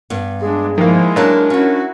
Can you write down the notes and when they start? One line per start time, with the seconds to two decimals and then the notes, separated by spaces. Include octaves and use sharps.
0.10 G2 B3
0.42 G#3 D4 G#4
0.78 D#3 F3 G#3 A#3 E4
1.16 F#3 A#3 D4 A#4 A5
1.50 C#4 D4 E4 F#4